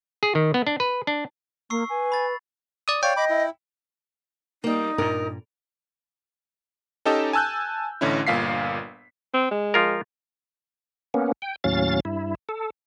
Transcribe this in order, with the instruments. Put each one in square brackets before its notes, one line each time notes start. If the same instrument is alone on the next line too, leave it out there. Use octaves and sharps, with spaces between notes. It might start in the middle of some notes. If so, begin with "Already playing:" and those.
[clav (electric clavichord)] G#4
D#3
B3
D4
B4
D4
[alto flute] A#3 [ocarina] A#5 [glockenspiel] C#6 E6 C7
[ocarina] B4 [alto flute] G#5
[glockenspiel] B5 A6
[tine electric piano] D5 D#6
[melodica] C#5 D5 [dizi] F5 [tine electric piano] G5
[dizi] D#5 [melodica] B5 D6
[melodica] E4
[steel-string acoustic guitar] G3 A#3 [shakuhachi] D#4
[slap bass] G2 A#2 [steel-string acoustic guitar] A#4
[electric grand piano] C#4 D#4 G4 A4 D#5 A5
G#5 A5 E6 F#6 G6
A1 D3 C#4 E4
G1 A#2 F5 B6 C7
[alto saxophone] C4
G#3
[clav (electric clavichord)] F3 F4 A#4
[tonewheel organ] A#3 B3 C#4
G5
D#2 A2 F#3 C#4 F5 A6
G2 E4
A4